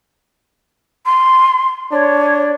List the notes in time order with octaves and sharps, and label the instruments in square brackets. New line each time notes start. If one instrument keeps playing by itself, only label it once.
[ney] C6
[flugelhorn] D4 [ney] C#5